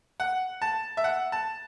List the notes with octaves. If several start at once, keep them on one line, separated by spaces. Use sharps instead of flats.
F#5
A5
E5
F#5
A5